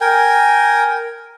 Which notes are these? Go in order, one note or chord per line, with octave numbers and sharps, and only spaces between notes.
A#4 G5 G#5